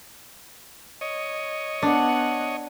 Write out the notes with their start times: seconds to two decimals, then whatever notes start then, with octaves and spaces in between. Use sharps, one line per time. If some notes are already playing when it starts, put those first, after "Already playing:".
1.01 C#5 D#5
1.82 B3 D4 F#5